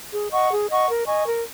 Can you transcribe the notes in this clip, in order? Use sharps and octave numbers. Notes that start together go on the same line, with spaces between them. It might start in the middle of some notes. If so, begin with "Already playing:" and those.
G#4
D#5 F#5 C#6
G#4
D#5 F#5 C#6
A#4
D#5 G#5 C#6
A#4